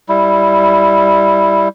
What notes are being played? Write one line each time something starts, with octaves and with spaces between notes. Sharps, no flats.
G3 E4